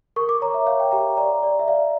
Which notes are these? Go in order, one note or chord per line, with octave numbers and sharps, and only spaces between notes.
A#4 C#6
D6
C#5 A#5
E5
C#5 F5
G5
G4 A#5
D5 A#5
D5
E5
D5 F5